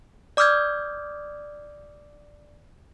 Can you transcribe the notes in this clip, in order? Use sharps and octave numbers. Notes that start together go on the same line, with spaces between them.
D5 D6 D#6 F6 G6 G#6